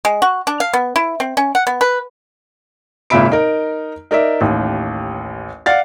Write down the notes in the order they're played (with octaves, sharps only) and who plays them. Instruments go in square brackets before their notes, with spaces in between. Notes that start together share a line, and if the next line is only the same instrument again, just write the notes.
[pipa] G#3
F#4
D4
F5
B3
E4
C4
C#4
F#5
B3
B4
[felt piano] G#1 A#2 C#3 E5 B5 D7
D#4 A#4
D#4 A#4 D5 E5
A1 D#2
D5 F5 F#5 A6